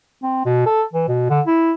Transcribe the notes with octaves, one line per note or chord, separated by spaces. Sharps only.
C4
B2
A4
E3
B2
D3
E4